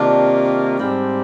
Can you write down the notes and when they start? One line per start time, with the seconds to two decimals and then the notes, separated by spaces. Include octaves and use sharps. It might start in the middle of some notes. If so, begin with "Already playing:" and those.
Already playing: C3 D#3 A#3 D4 F4
0.78 G#2 G3 C4